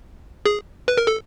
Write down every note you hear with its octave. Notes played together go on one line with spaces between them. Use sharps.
G#4
B4
A#4
A4